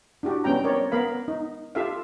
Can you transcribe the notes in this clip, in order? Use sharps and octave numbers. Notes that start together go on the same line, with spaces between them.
D4 E4 F#4 G4
G3 B3 C#4 G5 A#5
C4 A#4 C#5 D5
B3 A#4 F5 B5
D#4
F4 G4 A4 E5 F5